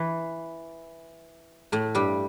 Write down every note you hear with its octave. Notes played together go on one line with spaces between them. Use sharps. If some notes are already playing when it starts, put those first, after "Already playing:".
Already playing: E3
A2 A3
G2 G3